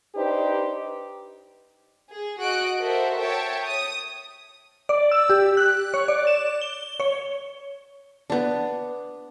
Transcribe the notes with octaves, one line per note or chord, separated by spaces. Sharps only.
D4 D#4 G4 B4 C5
G#4
F#4 D#5 F#6 D7
F#4 A4 A#4 C5 E5
C#5 E5 G5 A5
D#6
D5
E6
G4
F#6
C#5
D5
E7
G7
C#5
B3 D4